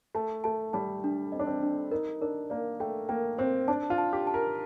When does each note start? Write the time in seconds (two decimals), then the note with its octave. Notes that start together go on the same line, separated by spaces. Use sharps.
0.15 A3 A5
0.44 A3 A5
0.73 G3 A5
1.04 D4
1.32 C4 D#5
1.40 D4
1.47 C4
1.63 D4
1.91 D#4 A#4
2.21 D4 A#4
2.50 A#3 D5
2.80 A3 G5
3.09 A#3 G5
3.38 C4 C5
3.68 D4 A5
3.90 F4
3.98 A5
4.13 G4
4.27 A5
4.34 A#4